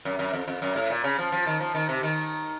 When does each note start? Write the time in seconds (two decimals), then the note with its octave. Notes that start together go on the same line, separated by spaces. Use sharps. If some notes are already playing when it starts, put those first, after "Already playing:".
0.05 F#2
0.19 F#2
0.33 F2
0.48 F2
0.62 F#2
0.76 A2
0.90 A#2
1.04 C#3
1.18 F3
1.32 F3
1.47 D#3
1.60 F3
1.75 D#3
1.89 C3
2.03 D#3